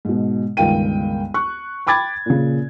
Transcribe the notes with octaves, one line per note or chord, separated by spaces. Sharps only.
G#2 B2
G1 C#2 D#3 F5 G5 D#7
C#6 F#6
G5 B5 D6 G#6 A6
A#2 C#3